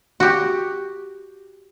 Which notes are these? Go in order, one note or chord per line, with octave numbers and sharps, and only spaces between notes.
F#4 G4